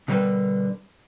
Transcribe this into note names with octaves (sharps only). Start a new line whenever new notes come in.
B2 D3 G3 A#4 B4